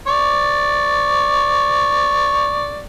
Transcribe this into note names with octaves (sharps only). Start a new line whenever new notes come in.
D5 C#6